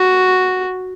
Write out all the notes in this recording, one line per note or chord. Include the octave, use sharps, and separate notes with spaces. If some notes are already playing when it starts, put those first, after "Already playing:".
Already playing: F#4